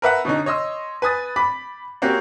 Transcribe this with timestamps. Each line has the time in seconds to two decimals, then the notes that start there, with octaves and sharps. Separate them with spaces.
0.02 A#4 B4 E5 F#5
0.25 B2 D3 C#4 D#4
0.46 C#5 D#5 C6 E6
1.02 B4 G#5 D#6 A6
1.36 B5 D6 B6
2.02 A#3 C4 C#4 F#4 G4